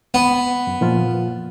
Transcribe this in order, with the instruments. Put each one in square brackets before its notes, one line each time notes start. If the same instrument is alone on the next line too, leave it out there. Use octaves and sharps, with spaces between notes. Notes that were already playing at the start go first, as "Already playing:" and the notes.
[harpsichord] B3
[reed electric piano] F#2
A#2 F3 F4